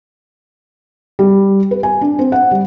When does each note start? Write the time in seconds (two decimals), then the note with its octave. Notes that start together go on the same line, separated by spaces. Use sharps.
1.19 G3
1.71 B4
1.83 G#5
2.01 D4
2.19 C4
2.32 F#5
2.51 G3